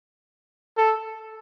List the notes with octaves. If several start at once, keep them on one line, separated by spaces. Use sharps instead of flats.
A4